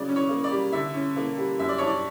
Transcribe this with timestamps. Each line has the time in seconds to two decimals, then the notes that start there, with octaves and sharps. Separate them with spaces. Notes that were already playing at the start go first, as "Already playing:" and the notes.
Already playing: C#3 F#3 D5
0.08 C#4
0.16 C#5
0.29 A#3
0.44 D5
0.51 G3
0.72 D3 E5
0.94 C#4
1.16 A#3
1.38 G3
1.59 F#2 E5
1.69 D5
1.78 D4 C#5
1.87 D5